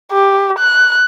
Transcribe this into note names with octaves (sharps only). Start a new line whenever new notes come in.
G4
F#6